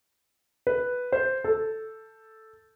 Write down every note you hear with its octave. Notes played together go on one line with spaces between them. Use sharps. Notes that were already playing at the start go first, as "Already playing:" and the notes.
B4
C5
A4